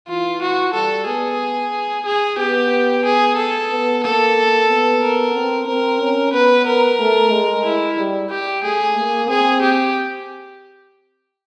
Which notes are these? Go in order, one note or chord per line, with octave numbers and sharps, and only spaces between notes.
E3 F4
F#4
G3 A4
B3 G#4
G#4
B3 G4
G#4
A4
B3
A#3 A4
B3
A#4
C4
C4 A#4
C#4
B3 B4
A#4
A3
G#3
E4
G3
G4
A3 G#4
A#3
C4 G#4
G4